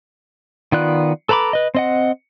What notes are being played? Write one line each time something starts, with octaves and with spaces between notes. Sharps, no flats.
D#3 B3 F4 D5 F#6
A4 B4 A#5 B5 D6
B4 D#5
C4 D#5 F#5